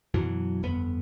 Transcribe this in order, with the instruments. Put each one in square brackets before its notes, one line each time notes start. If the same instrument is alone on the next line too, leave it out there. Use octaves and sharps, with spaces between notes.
[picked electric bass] F#2 B2 E3 F#3
G1 F2 B3